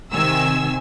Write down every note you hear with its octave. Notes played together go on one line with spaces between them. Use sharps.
C3 D#3 G#5 E6